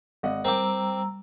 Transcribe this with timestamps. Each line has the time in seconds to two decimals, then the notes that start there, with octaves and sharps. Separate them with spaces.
0.23 G#1 D#5 F#5
0.45 G3 C4 A#4 G5 A#5 D6 E6